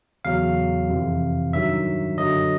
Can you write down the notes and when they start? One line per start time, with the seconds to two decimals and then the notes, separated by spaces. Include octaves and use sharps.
0.25 E2 C#3 F#3 F5
0.89 F2 C3 E3
1.53 G2 D#3 F#3 E5
2.18 F#2 D3 F#3 D#5